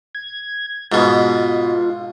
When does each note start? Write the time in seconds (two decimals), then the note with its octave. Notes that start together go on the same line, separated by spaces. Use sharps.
0.15 G#6
0.92 G#2 B2 F4